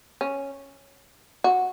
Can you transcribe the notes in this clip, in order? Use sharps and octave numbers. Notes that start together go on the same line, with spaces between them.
C#4
F#4